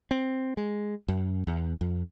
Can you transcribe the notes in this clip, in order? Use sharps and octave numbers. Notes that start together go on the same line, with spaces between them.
C4
G#3
F#2
E2
F2